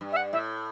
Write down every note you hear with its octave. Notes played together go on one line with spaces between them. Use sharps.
G2
E5
F#5
A2 E5